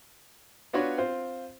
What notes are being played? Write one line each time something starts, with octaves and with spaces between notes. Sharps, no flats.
B3 D4 F4 F#4 B4 C#5
C4 F4 C5